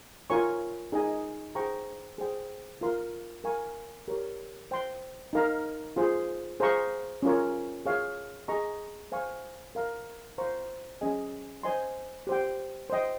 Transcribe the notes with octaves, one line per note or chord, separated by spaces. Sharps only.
F4 A#4 C#5 G#5 C#6
D#4 G#4 D#5 G#5
G#4 C5 G5 A#5 C#6
G#4 C5 G5
F4 A#4 F5 C6
A#4 F5 G#5 C#6
G4 A#4 C#5
C5 G5 C6
D#4 A#4 F5 A#5
F4 G#4 C5
G#4 C5 F5 A#5 C#6
C#4 F4 A#4 C#5
G#4 C#5 F5
G#4 D#5 A#5 C#6
C5 F5 G#5 C#6
A#4 F5 A#5
C5 F5 A#5 C#6
C#4 G#4 D#5 G#5
C5 D#5 G#5 C6
G4 C5 G5
C5 D#5 G5